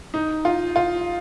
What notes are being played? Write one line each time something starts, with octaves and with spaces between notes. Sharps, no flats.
D#4
F4
F4